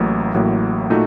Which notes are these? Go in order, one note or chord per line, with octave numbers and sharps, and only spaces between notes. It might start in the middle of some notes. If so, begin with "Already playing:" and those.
Already playing: A1 A2 F#3 A#3
A1 A2 F#3 A#3
A#2 A3 D#4 F#4